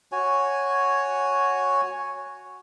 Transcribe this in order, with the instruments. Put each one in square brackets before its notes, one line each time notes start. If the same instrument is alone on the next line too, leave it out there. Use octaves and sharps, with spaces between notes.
[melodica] F#4 C#5 G#5